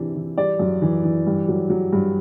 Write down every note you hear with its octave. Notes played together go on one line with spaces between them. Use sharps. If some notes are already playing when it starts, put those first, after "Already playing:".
Already playing: C3 E3 D4
E3
G3 D5
F#2
E3
E3
G2
F#3
F#3
G2